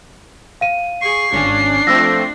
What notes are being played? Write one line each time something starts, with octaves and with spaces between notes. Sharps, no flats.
F5 D#7
G#4 C#6 C7
G#1 C#4 D4
F3 A3 C4 E6 A#6